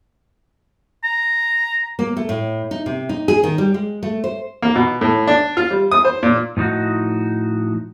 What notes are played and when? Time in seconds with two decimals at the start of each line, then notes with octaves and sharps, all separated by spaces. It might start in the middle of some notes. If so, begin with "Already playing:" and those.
1.04 A#5
1.99 A#3
2.17 A3
2.29 A2
2.71 D#4
2.86 C3
3.09 D#4
3.28 G#4
3.43 D#3
3.58 G3
3.74 G#3
4.03 A3
4.24 C5
4.62 A#3
4.76 B2
5.01 A2
5.27 D4
5.57 F4
5.71 G3
5.91 D#6
6.05 C5
6.23 A#2
6.57 A2 F3 C#4 D#4 F#4